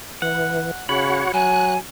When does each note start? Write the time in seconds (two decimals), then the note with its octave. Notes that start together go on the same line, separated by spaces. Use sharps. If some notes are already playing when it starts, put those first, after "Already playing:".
0.22 E3 F#5
0.89 C#3 F#4 C#5 F#5 B5
1.34 F#3 G#5 F#6